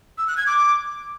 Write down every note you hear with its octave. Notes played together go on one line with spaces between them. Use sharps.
E6
F#6
G#6
D6